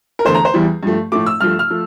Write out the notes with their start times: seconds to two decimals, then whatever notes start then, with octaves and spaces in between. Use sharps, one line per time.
0.19 A#4
0.25 E2 D3 A3 C5
0.35 A#5
0.45 C5
0.54 E2 E3 G3
0.83 G2 F3 A3
1.12 A2 F3 A3 D6
1.26 E6
1.41 G2 F3 A3 F6
1.59 F6
1.70 F3 A3